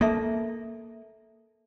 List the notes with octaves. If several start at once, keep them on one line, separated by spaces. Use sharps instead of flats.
A#3 A4 E5 A5